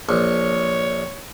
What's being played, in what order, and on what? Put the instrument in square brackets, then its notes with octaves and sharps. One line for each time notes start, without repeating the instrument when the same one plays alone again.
[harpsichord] A#1 [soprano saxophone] C#5